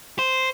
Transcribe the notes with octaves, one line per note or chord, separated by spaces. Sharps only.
C5